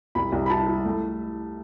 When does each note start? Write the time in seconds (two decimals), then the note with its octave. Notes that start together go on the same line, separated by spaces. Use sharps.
0.15 C2 B5
0.32 C2
0.46 B5
0.50 E4 A5
0.67 E4
0.85 A3